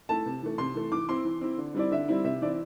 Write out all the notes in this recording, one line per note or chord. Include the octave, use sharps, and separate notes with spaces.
A3 E4 A5
C3
E3 A3
C3 C6
E3 A3
E3 D6
C4 E4 C6
E3
C4 E4
D3
G3 C4 E4 D5
D3 E5
G3 C4 E4
C3 E5
E3 C4 E4 D5